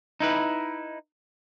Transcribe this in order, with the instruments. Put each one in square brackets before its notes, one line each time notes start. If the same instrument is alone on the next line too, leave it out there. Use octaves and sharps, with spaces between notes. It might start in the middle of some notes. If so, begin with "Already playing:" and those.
[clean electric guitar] D#4 E4 B4